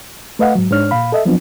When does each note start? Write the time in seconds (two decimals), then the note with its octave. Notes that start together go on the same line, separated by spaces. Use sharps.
0.39 A3 B4 D#5 F5 F#5
0.55 G#2 F#3
0.71 G#2 D4 C#5 F6
0.91 A#2 F5 B5
1.12 A4 D#5 E5
1.25 F3 F#3 B3 C4 D4 F4